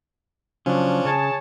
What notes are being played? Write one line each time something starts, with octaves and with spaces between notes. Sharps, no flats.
C#3 F3 F#3 C#4 D4
C#3 G#4 C#5 A5